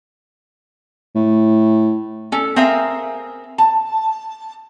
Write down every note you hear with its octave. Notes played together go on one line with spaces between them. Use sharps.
A2
C#4 A4
C4 G#4 A#4 E5 F5 G#5
A5